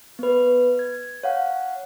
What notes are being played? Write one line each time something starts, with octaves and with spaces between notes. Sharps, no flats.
B3 B4
G#6
C#5 F5 F#5